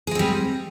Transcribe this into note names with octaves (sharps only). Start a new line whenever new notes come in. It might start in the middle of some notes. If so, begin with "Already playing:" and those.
G3 G#3 C4 G#4